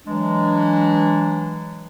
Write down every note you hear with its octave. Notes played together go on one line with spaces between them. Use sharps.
E3 F#3 G#3 D4